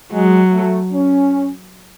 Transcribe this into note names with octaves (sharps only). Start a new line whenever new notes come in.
F#3 G#3
A3
C#4